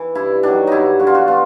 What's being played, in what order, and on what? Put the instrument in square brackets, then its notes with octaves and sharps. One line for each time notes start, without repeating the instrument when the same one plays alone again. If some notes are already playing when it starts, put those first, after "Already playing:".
Already playing: [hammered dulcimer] E3
G2 E4
D#3 F#3 D4
G2 D#4 E4
D3 F3 F#4
F4
F#4
B2 F4